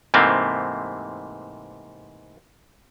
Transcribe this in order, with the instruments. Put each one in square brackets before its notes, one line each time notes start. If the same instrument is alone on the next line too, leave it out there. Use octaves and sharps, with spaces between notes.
[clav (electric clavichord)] G#2 C3 E3 A3 A#3 C4